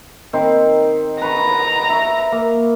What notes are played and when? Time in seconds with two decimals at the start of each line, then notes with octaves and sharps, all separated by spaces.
0.33 D#3 C4
1.22 B4 A#5 C#6
1.90 E5 C#6
2.32 A#3